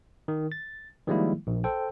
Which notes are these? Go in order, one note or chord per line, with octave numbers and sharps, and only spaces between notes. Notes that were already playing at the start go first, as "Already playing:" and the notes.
D#3
A6
D#3 F3 G3 G#3 A#3 E4
A#1
A4 C5 G5